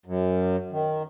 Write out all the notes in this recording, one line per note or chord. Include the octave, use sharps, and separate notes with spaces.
F#2
D#3